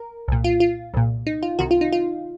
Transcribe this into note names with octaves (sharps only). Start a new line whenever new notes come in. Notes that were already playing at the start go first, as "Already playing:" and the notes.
Already playing: A#4
C2 A#2
F4
F4
C2 A#2
D#4
F4
C2 C3 D#3 F#4
F4
D#4
F4